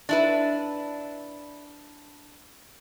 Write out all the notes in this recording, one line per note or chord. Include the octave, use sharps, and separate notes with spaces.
D4 E4 B4